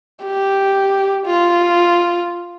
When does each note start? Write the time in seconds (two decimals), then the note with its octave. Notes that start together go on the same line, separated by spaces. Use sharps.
0.23 G4
1.26 F4